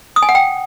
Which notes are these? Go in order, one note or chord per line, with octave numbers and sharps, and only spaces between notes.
D#6
G#5
F#5
G5